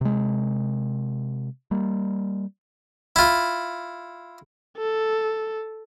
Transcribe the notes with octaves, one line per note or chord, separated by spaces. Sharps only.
C3 G#3
G3 A#3
E4 F4
A4